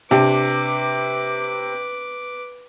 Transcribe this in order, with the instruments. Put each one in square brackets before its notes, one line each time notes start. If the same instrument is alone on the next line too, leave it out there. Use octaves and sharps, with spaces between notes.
[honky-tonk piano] C3 [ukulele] D4 G5 [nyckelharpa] B4 D6